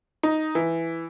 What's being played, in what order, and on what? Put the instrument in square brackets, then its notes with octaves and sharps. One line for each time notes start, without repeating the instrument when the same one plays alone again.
[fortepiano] D#4
E3